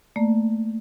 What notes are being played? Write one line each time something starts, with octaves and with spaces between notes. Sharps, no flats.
A3 A#3 D5